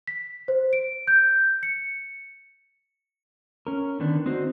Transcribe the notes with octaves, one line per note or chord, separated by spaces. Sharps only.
B6
C5
D7
G6
C#7
C#4 A#4
D3 D#3 B3 D4
C4 D#4 F#4 C5